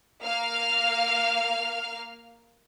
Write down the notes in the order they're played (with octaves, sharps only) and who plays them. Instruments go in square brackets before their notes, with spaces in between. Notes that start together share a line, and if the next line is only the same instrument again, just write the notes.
[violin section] A#3 F5 F6